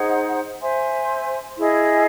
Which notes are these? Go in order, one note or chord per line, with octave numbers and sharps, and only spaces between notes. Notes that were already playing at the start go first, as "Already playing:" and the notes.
Already playing: D#4 G#4 C5 F#5
C5 E5 G#5 C6
E4 G#4 D#5